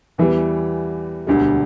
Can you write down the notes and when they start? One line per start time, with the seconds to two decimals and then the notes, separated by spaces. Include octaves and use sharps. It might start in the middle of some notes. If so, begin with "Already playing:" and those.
0.18 E2 E3 G3
1.27 E1 D2 D3 G3